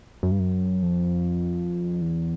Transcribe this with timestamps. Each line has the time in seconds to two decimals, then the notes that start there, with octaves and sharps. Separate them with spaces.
0.23 F#2
0.31 G2
0.39 F#2
0.82 F2
2.01 E2